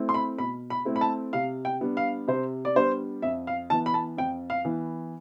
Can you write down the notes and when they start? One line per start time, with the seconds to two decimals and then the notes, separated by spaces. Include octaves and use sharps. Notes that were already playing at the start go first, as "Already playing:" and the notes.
Already playing: A3 C4 E4
0.09 C6
0.14 B5
0.38 B2 B5
0.70 B5
0.85 A3 C4 E4
0.96 B5
1.01 A5
1.33 C3 F5
1.65 G5
1.81 G3 B3 D4
1.97 F5
2.28 C3 C5
2.65 D5
2.75 G3 B3 D4 C5
3.22 F2 E5
3.47 F5
3.70 E3 B3 A5
3.86 B5
3.94 A5
4.17 F2 G5
4.50 F5
4.65 E3 B3